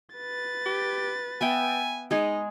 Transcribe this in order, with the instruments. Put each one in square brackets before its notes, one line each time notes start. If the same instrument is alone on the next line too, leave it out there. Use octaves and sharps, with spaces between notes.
[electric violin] B4 A6
[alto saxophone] G4
[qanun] B3 E5 G5 [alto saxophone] G#5
[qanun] G#3 G#4 [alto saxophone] D#4